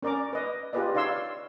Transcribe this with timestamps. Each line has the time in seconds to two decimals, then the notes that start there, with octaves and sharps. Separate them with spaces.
0.03 C#4 A#4 D5 A#5 D6
0.33 B4 D#5
0.73 F4 G4 G#4 B4 D5 D#5
0.94 D#4 C#5 D5 F5 C6 E6